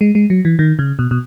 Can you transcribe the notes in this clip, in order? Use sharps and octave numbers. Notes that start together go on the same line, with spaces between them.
G#3
G#3
F#3
E3
D#3
C#3
B2
B2